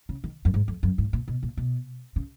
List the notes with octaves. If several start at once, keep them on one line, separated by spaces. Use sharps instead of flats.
C#3
D#3
F#2
G#2
F2
F#2
G#2
A#2
B2
A#2
B2
C#3